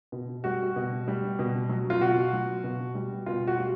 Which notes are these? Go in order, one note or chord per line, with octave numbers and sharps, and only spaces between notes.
B2
G3 F#4
B2
G3
B2
F#3
F4
B2 F#4
F#3
B2
G3
B2 F4
F#4
G3